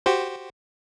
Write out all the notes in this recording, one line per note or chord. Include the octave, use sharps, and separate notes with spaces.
F#4 G4 C5